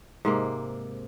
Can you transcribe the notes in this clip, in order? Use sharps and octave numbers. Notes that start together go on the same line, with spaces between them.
G#2 C3 A#3